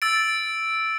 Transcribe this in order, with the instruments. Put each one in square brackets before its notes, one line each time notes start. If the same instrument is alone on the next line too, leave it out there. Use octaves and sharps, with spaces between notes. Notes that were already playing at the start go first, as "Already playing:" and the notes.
[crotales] E6 A6 D7